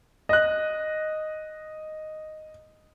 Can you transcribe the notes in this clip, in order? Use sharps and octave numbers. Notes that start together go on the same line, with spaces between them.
D#5 F#6